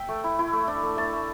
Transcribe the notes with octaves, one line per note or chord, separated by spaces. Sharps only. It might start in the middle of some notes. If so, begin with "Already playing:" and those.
Already playing: E5 G5
A3
E4
E4
A3
D4
A3
A3 A5
A3